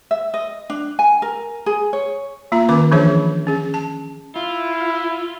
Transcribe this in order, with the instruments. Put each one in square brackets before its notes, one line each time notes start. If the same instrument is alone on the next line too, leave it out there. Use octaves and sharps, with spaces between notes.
[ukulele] E5
D#5
D4
G#5
A#4
G#4
C#5
[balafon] A#3 F4 A#5
D#3 C#4 B4 D6
E3 F3 D4 G#4 C#5 E5
C#4 G#4
A5
[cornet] E4 [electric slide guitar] F4